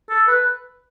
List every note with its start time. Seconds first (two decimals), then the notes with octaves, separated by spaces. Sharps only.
0.10 A4
0.28 B4